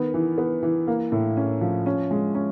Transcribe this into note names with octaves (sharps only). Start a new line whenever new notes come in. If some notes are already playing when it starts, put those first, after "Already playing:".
Already playing: D#3 B3
E3
B3
E3
A#3
A2
C#4
F3
C#4
G#3
C#4